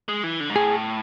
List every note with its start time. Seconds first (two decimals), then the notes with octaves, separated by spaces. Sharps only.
0.08 G#3
0.24 E3
0.40 D3
0.50 G#2
0.56 A2 G#4